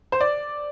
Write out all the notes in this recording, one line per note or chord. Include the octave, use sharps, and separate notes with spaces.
C5
D5